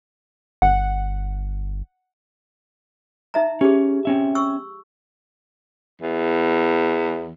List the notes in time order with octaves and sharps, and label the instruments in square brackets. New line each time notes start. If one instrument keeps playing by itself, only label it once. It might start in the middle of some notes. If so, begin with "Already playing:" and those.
[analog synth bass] G1 [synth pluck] F#5
[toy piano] D#4 E5 A#5
[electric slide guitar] C#4 [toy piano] G4 G#4
[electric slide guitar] C4 C#4 E5
[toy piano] C#6 E6
[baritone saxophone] E2